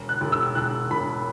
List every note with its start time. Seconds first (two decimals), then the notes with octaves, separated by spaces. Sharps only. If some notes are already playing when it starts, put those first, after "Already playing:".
Already playing: E1
0.09 F#6
0.21 E1
0.32 E6
0.55 E1 F#6
0.91 E1 B5